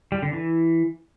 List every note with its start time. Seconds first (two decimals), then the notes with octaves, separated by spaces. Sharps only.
0.12 G3
0.23 D3
0.33 E3